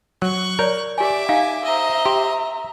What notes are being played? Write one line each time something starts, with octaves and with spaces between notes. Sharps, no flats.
F#3 C#6 F#6
A#4 C#5 D5
G4 D5 E5 G#5 D6
D#4 F5 G#5
C5 D#5 E5 A#5
G4 C6